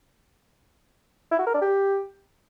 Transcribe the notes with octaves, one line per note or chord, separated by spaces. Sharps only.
E4
F#4
A#4
D4
G4